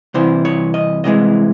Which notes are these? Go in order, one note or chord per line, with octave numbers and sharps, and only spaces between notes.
C2 C3 E3 C5
C#5
D#5
C2 C3 E3 G#3 D#5